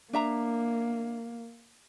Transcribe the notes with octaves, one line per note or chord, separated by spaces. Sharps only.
A#3 D4 E5 A#5